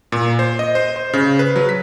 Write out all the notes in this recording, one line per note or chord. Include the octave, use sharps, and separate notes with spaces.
A#2
C5
D#5
C5
C5
C#3
B4
F#3
B6